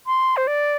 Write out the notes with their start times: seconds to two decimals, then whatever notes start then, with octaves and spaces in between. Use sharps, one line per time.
0.07 C6
0.37 C5
0.47 D5